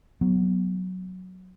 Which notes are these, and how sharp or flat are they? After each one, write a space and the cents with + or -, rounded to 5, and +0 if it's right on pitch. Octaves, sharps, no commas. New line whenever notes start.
F#3 +0 B3 +0